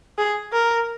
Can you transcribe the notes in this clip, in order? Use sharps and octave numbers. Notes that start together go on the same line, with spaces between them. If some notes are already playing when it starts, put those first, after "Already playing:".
G#4
A#4